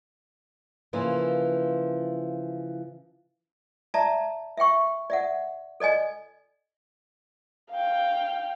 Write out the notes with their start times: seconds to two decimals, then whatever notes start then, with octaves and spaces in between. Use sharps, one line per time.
0.93 C#3 E3 F3 A#3
3.94 D5 E5 A5 A#5
4.57 E5 F5 G5 C#6
5.10 D5 E5 F#5
5.80 A4 D5 D#5 G#5
7.71 F5 G5